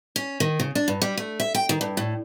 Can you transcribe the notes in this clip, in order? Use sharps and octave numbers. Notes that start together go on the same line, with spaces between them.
C#4
D#3
C#3
D4
G2
G3
A3
E5
G5
D#3
G2
A2